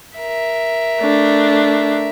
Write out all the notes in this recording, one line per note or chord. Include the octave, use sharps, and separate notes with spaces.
A#4 E5
A3 D4